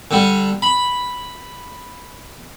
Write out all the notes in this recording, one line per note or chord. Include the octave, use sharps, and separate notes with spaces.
D3 G3
B5